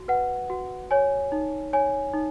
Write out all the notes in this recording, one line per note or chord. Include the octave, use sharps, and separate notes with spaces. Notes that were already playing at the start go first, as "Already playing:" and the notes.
Already playing: F#4
B4 F#5
F#4
C#5 G#5
D#4
C#5 G#5
D#4